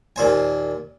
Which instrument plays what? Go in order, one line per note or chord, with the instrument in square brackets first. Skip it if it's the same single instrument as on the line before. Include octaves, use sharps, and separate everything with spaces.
[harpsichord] D#2 A#2 C5 G#5